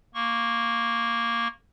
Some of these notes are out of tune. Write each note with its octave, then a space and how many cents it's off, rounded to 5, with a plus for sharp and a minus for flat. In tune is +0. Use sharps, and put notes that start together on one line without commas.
A#3 +0 C#6 -20